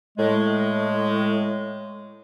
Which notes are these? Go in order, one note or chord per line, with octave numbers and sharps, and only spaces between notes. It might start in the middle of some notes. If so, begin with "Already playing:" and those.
A2 G#3